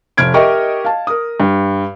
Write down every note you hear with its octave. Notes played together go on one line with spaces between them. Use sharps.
F1 F6 G#6 D7
G4 A#4 D#5 E5 G5 C#6
F5 A5
A#4 D#6
G2